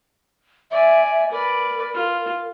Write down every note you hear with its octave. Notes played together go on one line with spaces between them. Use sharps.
D5 E5 G#5
A#4 B4 D5
F4